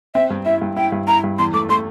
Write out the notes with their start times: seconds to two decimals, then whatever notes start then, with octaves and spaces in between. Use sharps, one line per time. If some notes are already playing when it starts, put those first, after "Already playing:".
0.15 C4 E5
0.30 G2
0.46 E4 E5
0.61 G2
0.77 E4 G5
0.92 G2
1.08 E4 A#5
1.24 G2
1.39 E2 C6
1.54 A3 D6
1.69 A3 C6